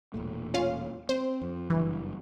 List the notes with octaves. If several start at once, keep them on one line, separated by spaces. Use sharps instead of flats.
E1 A#2 A3
C#4 F4 F5
C4 C5
F2
F#1 G2 E3